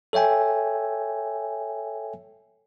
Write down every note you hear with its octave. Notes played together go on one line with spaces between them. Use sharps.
A4 C#5 E5 G5 G#5